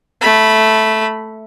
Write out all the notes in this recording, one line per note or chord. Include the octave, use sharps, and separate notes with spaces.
A3 B5